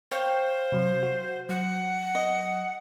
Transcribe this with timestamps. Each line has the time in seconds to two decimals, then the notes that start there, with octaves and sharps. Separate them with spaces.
0.11 C5 C#5 F5 G5
0.72 C3 F#3
1.03 F#4
1.49 F#3 F#5
2.15 D#5